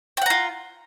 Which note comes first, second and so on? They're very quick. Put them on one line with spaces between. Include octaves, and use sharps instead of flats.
G5 F#5 A#5 F4